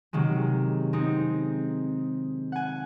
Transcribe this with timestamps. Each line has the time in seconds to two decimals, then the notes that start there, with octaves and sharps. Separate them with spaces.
0.13 C3 D#3 F#3 G#3
0.93 G#3 C4 D#4
2.52 F#5 G#5